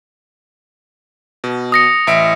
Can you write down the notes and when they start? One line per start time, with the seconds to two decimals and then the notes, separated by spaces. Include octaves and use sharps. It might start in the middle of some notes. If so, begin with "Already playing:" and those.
1.44 B2
1.72 D#6 A#6 C#7
2.07 A1 E5 D7